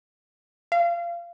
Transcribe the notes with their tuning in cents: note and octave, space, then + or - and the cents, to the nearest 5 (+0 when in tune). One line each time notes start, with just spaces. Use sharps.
F5 -25